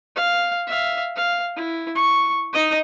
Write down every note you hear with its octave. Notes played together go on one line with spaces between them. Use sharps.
F5
E5 F5
F5
E4
C#6
D#4 D#5